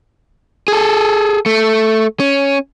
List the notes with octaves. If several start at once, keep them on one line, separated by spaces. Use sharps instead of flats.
G#4 A4
A3
C#4